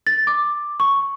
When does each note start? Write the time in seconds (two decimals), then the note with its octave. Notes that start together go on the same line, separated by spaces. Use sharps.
0.07 A6
0.27 D6
0.80 C#6